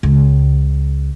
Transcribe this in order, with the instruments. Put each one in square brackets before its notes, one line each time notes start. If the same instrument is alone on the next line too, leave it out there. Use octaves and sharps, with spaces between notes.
[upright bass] C#2